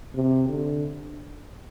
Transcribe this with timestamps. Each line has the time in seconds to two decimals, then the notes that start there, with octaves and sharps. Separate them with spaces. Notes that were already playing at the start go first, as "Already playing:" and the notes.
0.15 C3
0.49 D3